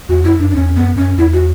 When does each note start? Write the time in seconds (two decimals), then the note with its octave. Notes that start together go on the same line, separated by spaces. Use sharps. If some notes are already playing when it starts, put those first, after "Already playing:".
0.09 E2 F#4
0.24 F#2 E4
0.39 F#2 D4
0.50 D4
0.55 E2 C#4
0.75 F#2 B3
0.96 F#2 C#4
1.18 E2 E4
1.33 F#4